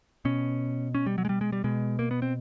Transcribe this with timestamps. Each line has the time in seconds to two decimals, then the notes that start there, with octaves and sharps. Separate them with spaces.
0.25 B2 C#4
0.95 C#4
1.06 G3
1.18 F#3
1.25 G#3
1.29 G3
1.41 G#3
1.52 G3
1.64 B2 G#3
1.99 A#3
2.11 B3
2.22 C4